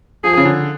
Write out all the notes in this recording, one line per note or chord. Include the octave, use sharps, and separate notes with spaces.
F3 G#4
C#3
D3